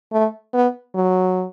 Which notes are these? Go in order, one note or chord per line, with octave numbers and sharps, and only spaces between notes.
A3
B3
F#3